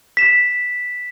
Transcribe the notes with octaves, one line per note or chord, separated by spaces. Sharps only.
B6 E7